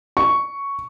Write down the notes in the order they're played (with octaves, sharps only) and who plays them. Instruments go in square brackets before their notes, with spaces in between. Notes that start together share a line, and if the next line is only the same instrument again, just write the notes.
[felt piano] C#6